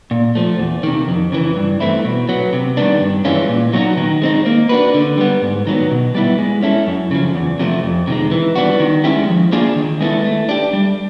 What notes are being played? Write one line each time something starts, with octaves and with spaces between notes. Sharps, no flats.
A#2
F3 A3
E2
C3 D#3
F2
C#3 E3
G2
E3 A3 C4 E4
B2
F#3 B3
C3
D#3 G3 B3 D4
G2
E3 G#3 C#4 F4
A#2
F#3 B3 D#4 F#4
D#3
G#3 C4 D#4
A#3
D4 F#4 B4
D3
G3 B3
G#2
D#3 F#3 B3
B2
G3 B3 E4
G#3
C#4 E4 A4
F#2
C#3 F3
E2
C3 F3 A3
F2
C3 D#3 G#3
E3
G3 B3 D4 F#4
D#3
G#3 C#4 E4 G4
F3
A#3 D4 F4 G#4
D#3
G#3 B3 E4 A4
A3
D4 G4
G3